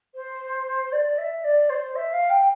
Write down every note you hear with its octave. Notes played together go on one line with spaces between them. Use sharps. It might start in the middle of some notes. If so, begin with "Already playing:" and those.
C5
D5
E5
D5
C5
E5
F5
G5